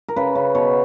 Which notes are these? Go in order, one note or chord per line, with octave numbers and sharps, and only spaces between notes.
A#4
C#3 B4
C#3
B2 C#5